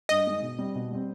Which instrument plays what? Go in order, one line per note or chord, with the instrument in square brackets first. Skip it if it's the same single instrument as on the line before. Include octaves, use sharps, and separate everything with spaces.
[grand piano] G2 [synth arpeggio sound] D#5
[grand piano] D#3 G#3
B2
G3 C4
B2
G3 C4